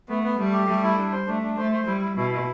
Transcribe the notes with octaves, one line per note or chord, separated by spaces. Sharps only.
A3 B3
B3
G3 A3
G4
G3 A3
E4
D4
C5
A3 D4
D4
A3 C5
C5
G3 E4
E4
B2 E4
E4